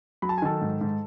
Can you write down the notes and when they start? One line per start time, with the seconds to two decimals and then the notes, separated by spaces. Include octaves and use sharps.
0.22 F#3 B5
0.29 A5
0.38 G#5
0.42 D#3 A4 A5
0.61 G#2
0.81 G#2